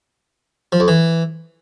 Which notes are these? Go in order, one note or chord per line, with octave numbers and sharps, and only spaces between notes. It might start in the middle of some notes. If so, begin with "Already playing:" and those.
F3
F2
E3